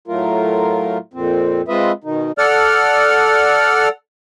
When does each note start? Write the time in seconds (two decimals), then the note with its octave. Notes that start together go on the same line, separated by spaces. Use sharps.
0.08 A2 F#3 A3 F4 A#4
1.14 F2 A#2 C4
1.68 G#3 C4 F4 B4 D#5 E5
2.04 B2 D#3 D#4
2.38 A4 D5 F#5 F6